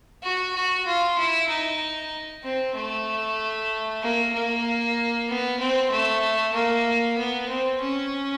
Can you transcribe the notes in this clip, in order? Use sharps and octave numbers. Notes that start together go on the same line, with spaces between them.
F#4
F#4
F4
E4
D#4
C4
A3
A#3
A#3
B3
C4
A3
A#3
B3
C4
C#4